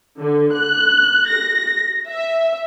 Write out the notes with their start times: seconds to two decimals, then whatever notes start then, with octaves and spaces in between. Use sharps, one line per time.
0.19 D3
0.54 F#6
1.29 A#6
2.08 E5